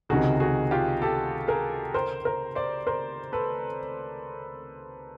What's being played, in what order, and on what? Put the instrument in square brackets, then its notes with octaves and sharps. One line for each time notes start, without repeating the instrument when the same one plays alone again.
[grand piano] C#2 C3 D#3 [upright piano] F#4 G#4
[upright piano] F#4 G#4
F4 G4
G4 A4
G#4 A#4
A#4 C5
A#4 C5
C5 D5
A#4 C5
A4 B4